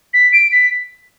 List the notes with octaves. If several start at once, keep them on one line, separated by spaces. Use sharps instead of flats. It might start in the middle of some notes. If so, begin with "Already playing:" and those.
B6
D7
B6